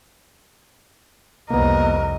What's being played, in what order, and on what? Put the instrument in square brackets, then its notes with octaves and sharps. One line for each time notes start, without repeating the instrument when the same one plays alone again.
[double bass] C2 F2 [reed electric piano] A#3 B3 [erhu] A#4 [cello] D#5